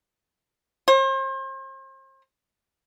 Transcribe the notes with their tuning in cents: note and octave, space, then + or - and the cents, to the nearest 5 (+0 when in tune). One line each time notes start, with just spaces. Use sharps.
C5 +40